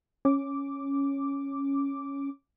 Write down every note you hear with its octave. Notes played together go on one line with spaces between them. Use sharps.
C#4 D6